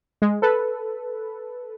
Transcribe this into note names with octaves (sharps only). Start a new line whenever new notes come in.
G#3
A4 B4